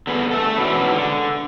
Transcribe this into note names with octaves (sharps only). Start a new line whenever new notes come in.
D3 B3 G#4
A4 E5
G#2 B2 B3 C#4 D4 E4
D3